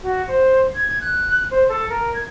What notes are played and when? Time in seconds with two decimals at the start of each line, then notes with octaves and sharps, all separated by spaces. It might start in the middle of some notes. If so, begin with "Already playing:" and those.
0.03 F#4
0.28 C5
0.75 G#6
1.01 F#6
1.51 C5
1.69 A4
1.89 A#4
2.14 G#6